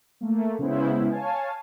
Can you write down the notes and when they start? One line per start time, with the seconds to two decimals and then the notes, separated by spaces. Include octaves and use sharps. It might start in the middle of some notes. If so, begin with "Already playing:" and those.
0.21 A3 A#3
0.59 C#3 G#3 B3 C#4 E4 C5
1.10 C#5 F5 G#5 A5